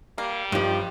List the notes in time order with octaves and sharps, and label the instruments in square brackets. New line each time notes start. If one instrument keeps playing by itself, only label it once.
[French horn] G3 [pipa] A#3
[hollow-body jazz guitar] G2 F3 [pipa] D#3 [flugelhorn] G4